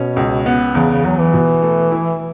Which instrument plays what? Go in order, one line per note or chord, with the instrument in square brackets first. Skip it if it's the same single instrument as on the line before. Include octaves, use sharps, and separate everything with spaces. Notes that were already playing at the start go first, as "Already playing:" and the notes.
Already playing: [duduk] B2 [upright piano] C#4
[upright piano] C#2
B3
[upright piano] E2 [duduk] C#3
[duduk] C#3
[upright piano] E2 [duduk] F#3
[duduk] E3
[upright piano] B2
A3
E4